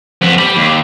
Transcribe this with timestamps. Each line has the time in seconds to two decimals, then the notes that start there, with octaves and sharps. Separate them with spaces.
0.21 F2 B3
0.39 G4 B5
0.57 D#2